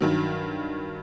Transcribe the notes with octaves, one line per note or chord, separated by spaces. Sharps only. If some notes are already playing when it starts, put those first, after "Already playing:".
G2 D#3 F#3